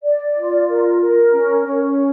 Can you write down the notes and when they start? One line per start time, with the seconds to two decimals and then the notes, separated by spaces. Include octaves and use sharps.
0.03 D5
0.36 F4
0.68 A#4
1.01 A#4
1.34 C#4
1.66 C#4